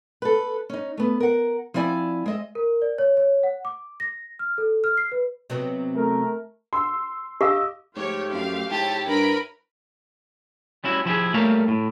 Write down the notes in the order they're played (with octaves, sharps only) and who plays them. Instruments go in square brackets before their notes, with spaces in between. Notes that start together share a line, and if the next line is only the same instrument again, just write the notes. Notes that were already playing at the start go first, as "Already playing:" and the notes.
[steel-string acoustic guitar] A4 B4
C#4 D#4
A3 B3
A#4 F#5
F3 C4 E4 D5 G#5
G#3 D#5 E5
[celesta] A#4
D5
C#5
C#5
F#5
D6
A#6
F6
A4
F6
C7
B4
[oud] C3 F#3 B3
[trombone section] A3 A#4
[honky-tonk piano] C6 E6
[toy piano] G4 F5 [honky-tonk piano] D#5 D6 E6
[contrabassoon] G#2 [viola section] F3 A3 G4 [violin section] C#5
[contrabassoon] F#2 [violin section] F5
[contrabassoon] G#2 [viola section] E4 C#5 [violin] G4 [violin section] A5
[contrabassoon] G2 [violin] A#4 [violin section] B4 B5 D7
[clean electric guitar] G3 C#4 E4 F#4
F3 E4 G4 G#4
G3 A3 A#3 C#5 E5 F5
A2